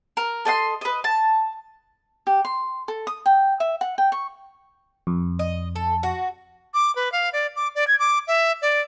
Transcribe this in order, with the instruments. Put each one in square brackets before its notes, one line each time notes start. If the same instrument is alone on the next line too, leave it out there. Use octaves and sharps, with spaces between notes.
[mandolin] A#4
A4 D#5 F#5 C6
B4 D#5
A5
[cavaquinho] G4
C6
A4
D#6
G5
E5
F#5
G5
C#6
[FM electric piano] F2
[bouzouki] D#5
A4
F#4
[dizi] D6
B4
F5
D5
D6
D5
G#6
D6
E5
D5